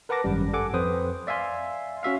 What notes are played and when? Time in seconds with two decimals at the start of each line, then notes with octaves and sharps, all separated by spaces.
0.09 A#4 B4 F#5 A5 D6 A#6
0.24 G#1 F#2 G3
0.53 A4 F#5 G#5 D6
0.73 F2 C4 B4 C5 D#6
1.27 D5 E5 F5 G#5 C6
2.03 C#4 F#4 E5 F5